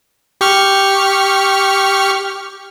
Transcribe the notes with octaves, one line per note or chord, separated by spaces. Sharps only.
G4 C#6 F6